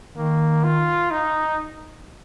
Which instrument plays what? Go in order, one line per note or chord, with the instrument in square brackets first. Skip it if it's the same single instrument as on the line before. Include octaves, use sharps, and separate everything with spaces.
[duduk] D#3 [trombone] A#3
[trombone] F4
D#4